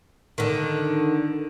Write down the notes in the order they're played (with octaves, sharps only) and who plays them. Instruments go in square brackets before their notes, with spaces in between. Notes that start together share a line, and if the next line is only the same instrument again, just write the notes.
[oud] D3 D#3